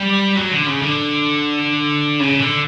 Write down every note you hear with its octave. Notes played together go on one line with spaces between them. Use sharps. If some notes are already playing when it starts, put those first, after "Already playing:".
Already playing: G3
F#3
D3
C#3
D3
C#3
D3